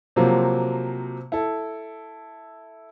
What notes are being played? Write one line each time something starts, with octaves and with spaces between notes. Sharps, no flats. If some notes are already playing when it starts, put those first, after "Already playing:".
C3 F3 F#3 A#3 C4
E4 A4